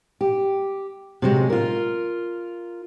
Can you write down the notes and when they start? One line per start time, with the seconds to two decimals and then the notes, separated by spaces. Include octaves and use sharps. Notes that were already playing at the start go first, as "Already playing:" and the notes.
0.21 G4
1.22 C3 F#3 G#3
1.50 F4 A#4